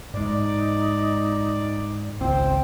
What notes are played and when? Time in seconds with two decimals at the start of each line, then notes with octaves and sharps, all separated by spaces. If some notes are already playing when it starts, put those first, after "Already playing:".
0.14 G#2 G#3 D#4 D5
2.21 G#1 C#2 C4 C5 G5